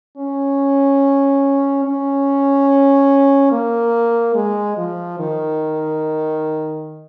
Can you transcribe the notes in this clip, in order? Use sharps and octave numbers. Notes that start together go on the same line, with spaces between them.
C#4
C#4
A#3
G#3
F3
D#3